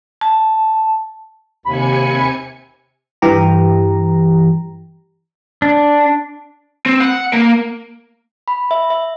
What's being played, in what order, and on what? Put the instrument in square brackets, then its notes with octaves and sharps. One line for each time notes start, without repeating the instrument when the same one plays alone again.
[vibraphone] A5
[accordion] D#2 B5 [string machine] C3 G#5 C#7
[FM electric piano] G2 E3 G4 A#5
[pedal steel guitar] D4
[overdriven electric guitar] C4
F#5
A#3
[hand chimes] B5
E5
E5